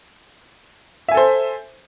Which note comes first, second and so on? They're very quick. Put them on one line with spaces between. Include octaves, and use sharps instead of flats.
E5 G#5 A4 C5